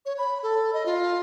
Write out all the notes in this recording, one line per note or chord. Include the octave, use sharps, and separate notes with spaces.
C#5
B5
A4
D#5
F4